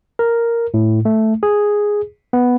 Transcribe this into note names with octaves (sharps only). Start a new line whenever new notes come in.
A#4
A2
A3
G#4
B3